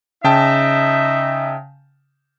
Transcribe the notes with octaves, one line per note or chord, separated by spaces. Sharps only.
C#3 D#4 E5 G5 A5